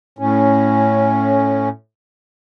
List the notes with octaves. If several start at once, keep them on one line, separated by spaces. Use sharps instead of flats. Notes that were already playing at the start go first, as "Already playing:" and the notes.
A2 C#4